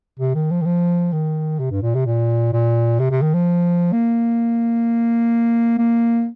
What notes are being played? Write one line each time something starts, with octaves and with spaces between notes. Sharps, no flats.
C3
D#3
F3
D#3
F3
D#3
C3
G2
A#2
C3
A#2
A#2
C3
C3
D#3
F3
A#3
A#3